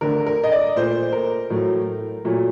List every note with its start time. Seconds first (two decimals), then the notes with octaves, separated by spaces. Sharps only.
0.01 D3 A3 A#4
0.26 A#4
0.44 D#5
0.52 D5
0.76 A#2 A3 C5
1.13 A#4
1.50 A2 F#3 A3
2.25 A#2 F#3 A3